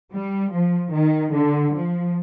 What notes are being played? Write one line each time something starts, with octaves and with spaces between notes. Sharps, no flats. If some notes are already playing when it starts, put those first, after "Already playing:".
G3
F3
D#3
D3
F3